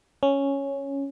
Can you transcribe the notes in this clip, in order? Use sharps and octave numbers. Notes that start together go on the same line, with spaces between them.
C#4